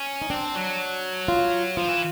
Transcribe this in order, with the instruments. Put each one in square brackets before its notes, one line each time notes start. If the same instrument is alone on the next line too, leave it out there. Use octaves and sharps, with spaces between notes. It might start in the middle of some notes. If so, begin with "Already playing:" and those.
Already playing: [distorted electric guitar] C#4
[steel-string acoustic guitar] D#4
[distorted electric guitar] C4 [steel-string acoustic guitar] D4
[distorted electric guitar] F#3
[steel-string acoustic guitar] F4
[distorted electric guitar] F3 [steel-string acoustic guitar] F4
[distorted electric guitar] E3